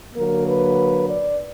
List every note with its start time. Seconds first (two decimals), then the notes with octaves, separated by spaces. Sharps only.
0.15 D3 F#3 A#3 A#4
0.47 B4
1.09 D5